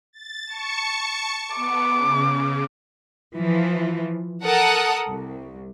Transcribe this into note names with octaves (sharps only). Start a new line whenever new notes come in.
A6
A5 C#6 C#7
B3 D6
C#3
E3 F3
A4 A#4 F#5 D#6
C2